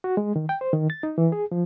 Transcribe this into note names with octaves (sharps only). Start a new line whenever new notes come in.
F#4
G#3
D#3
G5
C5
D#3
A6
D#4
E3
G#4
F3